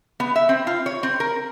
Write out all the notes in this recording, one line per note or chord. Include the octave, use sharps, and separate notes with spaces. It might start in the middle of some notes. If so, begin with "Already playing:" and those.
B3
E5
C4
F4
C#5
C4
A#4